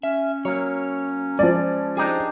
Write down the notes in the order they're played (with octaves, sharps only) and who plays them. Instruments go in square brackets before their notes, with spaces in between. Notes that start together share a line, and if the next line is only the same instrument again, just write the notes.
[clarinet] C#4 [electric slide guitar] E5
[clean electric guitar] F#3 A#3 [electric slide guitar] C#5
[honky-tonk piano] F3 D5 [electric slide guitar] G#3
[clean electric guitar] D4 D#4 G4 [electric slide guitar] G#4